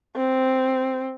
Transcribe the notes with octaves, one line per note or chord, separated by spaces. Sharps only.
C4